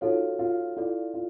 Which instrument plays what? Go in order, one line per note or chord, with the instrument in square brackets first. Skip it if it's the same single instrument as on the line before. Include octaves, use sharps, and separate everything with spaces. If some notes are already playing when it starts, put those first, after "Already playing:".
[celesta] D#4 F#4 A4 C#5 [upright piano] F4
[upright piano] F4
[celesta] E4 A4 D5 [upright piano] F4
[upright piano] F4